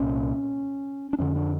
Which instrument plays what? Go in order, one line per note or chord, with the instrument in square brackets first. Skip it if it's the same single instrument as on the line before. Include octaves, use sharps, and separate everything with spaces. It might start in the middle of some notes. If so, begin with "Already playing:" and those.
Already playing: [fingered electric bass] C2 A#2 C#4
D4
F2 D3 C#4
D4